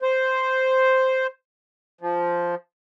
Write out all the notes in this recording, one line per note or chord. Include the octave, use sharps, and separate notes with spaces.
C5
F3